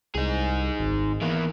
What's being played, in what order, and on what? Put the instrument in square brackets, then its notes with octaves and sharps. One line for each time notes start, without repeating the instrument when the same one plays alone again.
[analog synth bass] C2 [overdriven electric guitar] D#4 G#4
[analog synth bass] G#1
[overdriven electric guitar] E2 E3 [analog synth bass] A#3